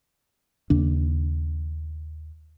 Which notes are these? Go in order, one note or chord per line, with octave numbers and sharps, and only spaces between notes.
D#2 C#3 D4